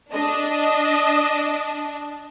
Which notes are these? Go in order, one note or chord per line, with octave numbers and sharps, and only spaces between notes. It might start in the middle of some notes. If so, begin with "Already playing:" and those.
D4 D#5